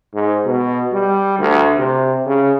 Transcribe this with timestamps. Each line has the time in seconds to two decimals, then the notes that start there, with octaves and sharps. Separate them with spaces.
0.14 G#2
0.45 B2
0.92 G3
1.39 D2
1.78 C3
2.26 C#3